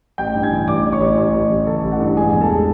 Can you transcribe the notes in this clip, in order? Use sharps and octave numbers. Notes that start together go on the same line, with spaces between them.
A1 G5 G6
G2
G#5 G#6
E3
A1 D5 D6
E3
C#5 C#6
A1
A1
A1
A1
E3 A4 A5
A1
F#5
G2
G#3 G#4 G#5
E2 G#5
A4 A5
G#3